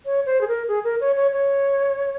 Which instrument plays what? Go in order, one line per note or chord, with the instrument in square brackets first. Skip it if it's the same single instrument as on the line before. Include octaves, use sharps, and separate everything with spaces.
[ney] C#5
C5
G#4
A#4
G#4
A#4
C#5
C#5
C#5